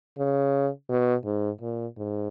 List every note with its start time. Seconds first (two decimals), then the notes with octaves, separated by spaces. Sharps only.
0.18 C#3
0.90 B2
1.25 G#2
1.61 A#2
1.97 G#2